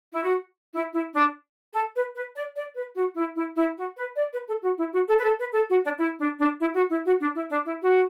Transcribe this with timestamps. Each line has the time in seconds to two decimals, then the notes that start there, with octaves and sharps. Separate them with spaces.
0.13 E4
0.23 F#4
0.74 E4
0.93 E4
1.14 D4
1.74 A4
1.95 B4
2.15 B4
2.36 D5
2.55 D5
2.76 B4
2.96 F#4
3.16 E4
3.36 E4
3.56 E4
3.77 F#4
3.97 B4
4.16 D5
4.33 B4
4.47 A4
4.62 F#4
4.78 E4
4.92 F#4
5.08 A4
5.17 B4
5.23 A4
5.38 B4
5.53 A4
5.69 F#4
5.84 D4
5.98 E4
6.20 D4
6.40 D4
6.60 E4
6.74 F#4
6.89 E4
7.05 F#4
7.20 D4
7.35 E4
7.50 D4
7.65 E4
7.81 F#4